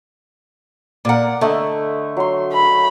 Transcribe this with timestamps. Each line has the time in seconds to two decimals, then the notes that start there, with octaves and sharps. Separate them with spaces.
1.05 A#2 A#4 D5 F#5
1.41 D3 A3 D#5 E5
2.17 F#3 C6
2.53 B5